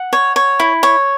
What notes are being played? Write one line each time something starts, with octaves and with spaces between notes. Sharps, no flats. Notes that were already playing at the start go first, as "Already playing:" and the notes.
Already playing: F#5
C#5
C#5
E4
C#5